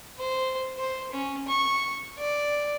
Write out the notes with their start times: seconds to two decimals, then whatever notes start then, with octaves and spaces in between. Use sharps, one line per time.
0.18 C5
0.77 C5
1.12 C#4
1.48 C#6
2.18 D5